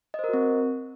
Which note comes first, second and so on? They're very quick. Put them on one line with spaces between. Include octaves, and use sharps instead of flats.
D#5 C5 A#4 F#4 C4